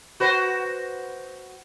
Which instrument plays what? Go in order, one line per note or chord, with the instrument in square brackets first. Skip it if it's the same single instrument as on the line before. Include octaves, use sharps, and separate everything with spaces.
[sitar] F#4 B4 C5